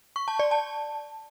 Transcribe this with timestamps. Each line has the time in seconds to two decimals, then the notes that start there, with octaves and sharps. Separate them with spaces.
0.16 C#6
0.28 A5
0.39 D5
0.51 A5